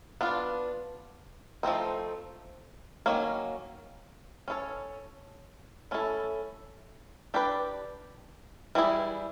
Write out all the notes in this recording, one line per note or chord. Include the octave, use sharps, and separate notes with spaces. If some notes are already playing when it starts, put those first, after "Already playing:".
B3 D4 F4
F3 A3 C4 D#4
D#3 F#3 A#3 C#4
C#4 E4 A4 C#5
A3 C#4 E4 A4
D4 G4 B4 D5
E3 G3 C4 E4 G#4